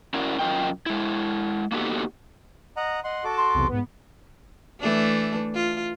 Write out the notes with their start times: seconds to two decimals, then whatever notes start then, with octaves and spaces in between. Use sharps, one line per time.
0.14 C#4 E4 F#4 A#4 D5
0.39 F#3 C#4 F4 A#4 D#5 G5
0.86 G#3 E4
1.72 A#3 B3 D#4 F#4 G4 A4
2.77 D#5 F#5 A#5
3.04 D#5 F#5 C6
3.24 F#4 A4 A5 D6
3.37 C6
3.54 B1 E2 C3
3.68 G#2 B3
4.81 E3 A3 D4
5.55 F4